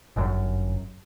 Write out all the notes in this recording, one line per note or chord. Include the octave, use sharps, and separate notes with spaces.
G1 F#2